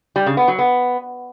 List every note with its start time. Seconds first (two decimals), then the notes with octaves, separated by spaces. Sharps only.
0.16 G3
0.26 C#3
0.37 B3
0.48 F#3
0.59 B3